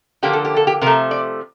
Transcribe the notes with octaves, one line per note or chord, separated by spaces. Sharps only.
D3 F3 A#3 G4
A4
G4
A4
G4
C3 F3 A3 A#4
D5